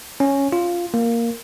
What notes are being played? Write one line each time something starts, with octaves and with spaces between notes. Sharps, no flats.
C#4
F4
A#3